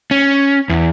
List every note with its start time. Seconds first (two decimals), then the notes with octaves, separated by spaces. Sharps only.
0.11 C#4
0.69 E2